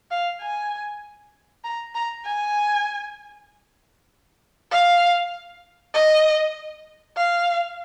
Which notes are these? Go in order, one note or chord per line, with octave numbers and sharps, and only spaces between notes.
F5
G#5
A#5
A#5
G#5
F5
D#5
F5